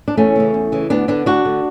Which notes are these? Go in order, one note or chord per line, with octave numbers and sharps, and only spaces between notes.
D4
E2 A3 C#4
C#3 E3
E2
C#3 E3
D2 B3 D4
D3 B3 D4
D2 D4 F#4
D3